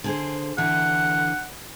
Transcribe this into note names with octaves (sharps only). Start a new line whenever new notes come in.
D3 G#4 C5
D3 E3 F#5